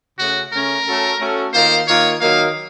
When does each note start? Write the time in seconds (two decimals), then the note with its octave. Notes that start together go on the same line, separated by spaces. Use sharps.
0.18 C#3 A3 C#4 F#4
0.52 C#3 A3 C#4 A#4
0.86 A3 C#4 F#4 A4
1.19 A3 C#4 F#4 A4
1.53 D#3 A#3 F4 A#4 C5
1.88 D#3 A#3 F4 A#4 C#5
2.20 D#3 F#3 A#3 F5